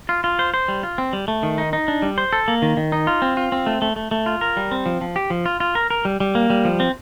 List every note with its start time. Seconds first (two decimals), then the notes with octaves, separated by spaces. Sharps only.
0.09 F4
0.24 F4
0.39 C5
0.54 C5
0.68 G3
0.83 F4
0.98 C4
1.13 G3
1.28 A3
1.43 D#3
1.58 D#4
1.73 D#4
1.88 D4
2.02 G3
2.18 C5
2.33 A4
2.48 A#3
2.62 D#3
2.77 D#3
2.92 D#4
3.07 F4
3.22 C4
3.37 F4
3.52 C4
3.67 A3
3.82 A3
3.96 A3
4.11 A3
4.26 F4
4.41 A#4
4.57 G3
4.72 C4
4.86 F3
5.01 F3
5.16 G4
5.30 F3
5.46 F4
5.60 F4
5.75 A#4
5.90 A#4
6.05 G3
6.20 G3
6.35 A#3
6.50 G3
6.65 F3
6.80 C4